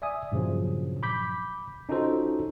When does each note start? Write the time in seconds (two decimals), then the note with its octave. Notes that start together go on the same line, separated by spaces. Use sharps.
0.02 D5 E5 G#5 D#6
0.32 G2 A#2 C#3 F3 F#3
1.03 B5 D6 G6 B6
1.89 C#4 D#4 F4 F#4 A4 C5